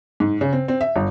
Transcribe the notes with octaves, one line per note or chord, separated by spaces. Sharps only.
G#2
C#3
C4
C4
E5
G1